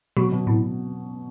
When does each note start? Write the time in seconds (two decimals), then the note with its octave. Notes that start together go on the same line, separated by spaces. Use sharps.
0.17 B2 F#3
0.32 B2
0.47 A2